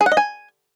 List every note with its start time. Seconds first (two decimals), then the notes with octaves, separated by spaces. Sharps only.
0.01 G#4
0.06 F#5
0.12 D#5
0.17 G#5